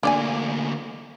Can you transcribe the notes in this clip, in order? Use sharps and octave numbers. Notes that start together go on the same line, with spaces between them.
D2 A#3 D4 D5 G#5